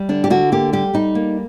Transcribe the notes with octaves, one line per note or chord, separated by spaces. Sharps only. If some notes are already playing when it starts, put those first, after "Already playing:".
Already playing: G3
D3 D4
G4
D3 F#4
A#3 G4
G3 G4
G3 D#4
A#3